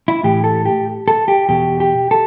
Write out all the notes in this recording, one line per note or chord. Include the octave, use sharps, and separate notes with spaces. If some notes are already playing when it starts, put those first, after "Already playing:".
E4
A2 E3 G4
A4
G4
A4
G4
E2 B2 G4
G4
A4